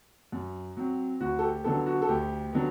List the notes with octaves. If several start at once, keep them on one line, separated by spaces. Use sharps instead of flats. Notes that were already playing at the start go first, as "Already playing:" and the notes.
F#2
F#3 C4
D2 F#4
A4
G4
D3 F#3 B3 A4
F#4
A4
D2 G4
D3 F#3 B3